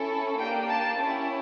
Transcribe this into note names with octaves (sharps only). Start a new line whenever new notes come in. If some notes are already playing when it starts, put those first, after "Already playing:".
Already playing: C#4 E4 A4
A#3 D4 G4 G5
A5
C#4 E4 G4